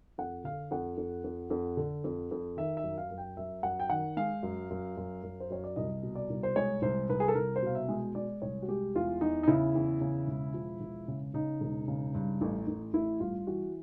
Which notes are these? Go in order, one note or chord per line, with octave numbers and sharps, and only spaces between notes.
F2 F#5
D3 F5
F2 F#5
F2
F2
F2
D3
F2
F2
D#3 E5
E5
F#2
F5
F#2
G5
F#2 E5
F#2 F#5
G5
D#3 F#5
G#3 F5
F#2
F#2
F#2
F#2
C5
F#2 C#5
D5
C2 D#5
B2
D5
C2
C5
G#3 C#5
C2 C5
C2 B4
G#4
A4
C2 A#4
C5
B2 F5
E5
G#3
G#3 D5
C2 C#5
F#4
G#3 G4
E2 F4
E2 D#4
D#4
C#3 E4
E2
C#3
E1
F3
E1
C#3
C#3 D#4
E1
C#3
G2
A1
A1
A1 E4
G2 F4
E3 F#4